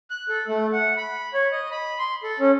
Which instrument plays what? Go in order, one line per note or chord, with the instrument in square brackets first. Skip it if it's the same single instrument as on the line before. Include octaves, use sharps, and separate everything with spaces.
[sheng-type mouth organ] F#6
A4
A3
F#5
B5
C#5
D#5
B5
C6
A4
C#4